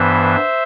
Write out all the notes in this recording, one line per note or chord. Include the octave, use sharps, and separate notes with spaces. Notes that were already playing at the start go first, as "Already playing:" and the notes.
Already playing: G2 E3 B3 C5 E5